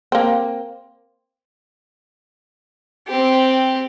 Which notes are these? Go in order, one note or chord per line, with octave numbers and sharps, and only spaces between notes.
A#3 C4
C4 G4